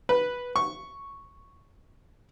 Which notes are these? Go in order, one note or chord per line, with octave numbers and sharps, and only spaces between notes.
B4
C#6